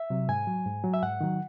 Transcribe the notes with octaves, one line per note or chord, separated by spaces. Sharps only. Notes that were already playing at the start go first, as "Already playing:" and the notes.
Already playing: E5
C3 F#3
G#2 G#5
F#3
G#2
F#3
E5
G#2 F#5
D#3 F#3